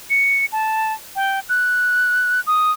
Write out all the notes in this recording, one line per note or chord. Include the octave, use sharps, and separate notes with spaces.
C#7
A5
G5
F#6
D#6